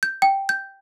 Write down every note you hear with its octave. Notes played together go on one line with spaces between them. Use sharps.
G6
G5
G6